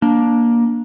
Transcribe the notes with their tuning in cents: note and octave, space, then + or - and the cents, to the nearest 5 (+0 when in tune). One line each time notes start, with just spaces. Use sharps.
A#3 +10 D4 +0